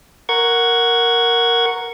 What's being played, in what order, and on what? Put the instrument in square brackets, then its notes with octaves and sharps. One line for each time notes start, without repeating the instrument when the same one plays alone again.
[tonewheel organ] A#4 F#5 C#6 G#6